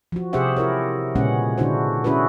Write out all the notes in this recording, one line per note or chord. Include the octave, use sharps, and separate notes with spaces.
F3 F#4
C3 G4 G#4 C5 E5 F#5
E4 A#4 C#5
A#2 C#3 G#3 B3 C#4 F#5
D3 D4 E4 F#4 C5
C#4 E4 F#4 G#4 B4